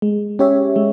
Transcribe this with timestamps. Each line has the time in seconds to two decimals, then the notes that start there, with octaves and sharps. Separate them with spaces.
0.02 G#3
0.39 C#4 G4 C#5 E5
0.76 G#3